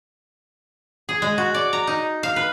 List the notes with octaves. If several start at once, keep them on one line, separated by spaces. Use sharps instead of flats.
G#4
G#3
F#4
D5
A#5
D#4
F5
B4